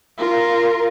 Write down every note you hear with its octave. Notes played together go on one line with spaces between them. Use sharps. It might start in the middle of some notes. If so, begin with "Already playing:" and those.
F4 A#4